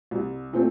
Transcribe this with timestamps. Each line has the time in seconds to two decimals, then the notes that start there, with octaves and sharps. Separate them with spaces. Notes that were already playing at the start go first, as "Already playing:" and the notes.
0.11 C2
0.53 A#2 A3 C4